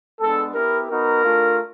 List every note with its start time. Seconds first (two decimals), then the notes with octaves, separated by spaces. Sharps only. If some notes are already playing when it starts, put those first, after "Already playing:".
0.20 G#3 B3 D4 A4
0.54 B3 E4 G4 A#4
0.89 B3 D#4 F#4 A#4
1.24 A3 D4 F4